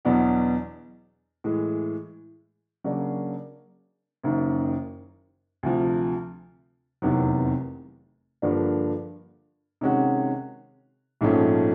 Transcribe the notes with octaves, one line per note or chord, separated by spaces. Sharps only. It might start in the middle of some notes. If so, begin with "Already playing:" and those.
E2 B2 F#3 B3 D4
A2 E3 G#3
C#3 F#3 A#3 D4
F#1 F#2 D#3
D2 C3 F3
F1 E2 C3 D#3 F#3
G2 D3 F3 A#3 D4
C3 D#3 G#3 C#4 F#4
A#1 G#2 F3 A3 C#4